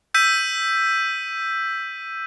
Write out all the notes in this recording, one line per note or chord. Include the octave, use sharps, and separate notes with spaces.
E6 G6 B6 D#7